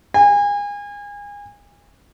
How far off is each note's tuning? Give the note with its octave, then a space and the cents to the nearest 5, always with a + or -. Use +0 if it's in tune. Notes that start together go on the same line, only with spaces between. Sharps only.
G#5 -30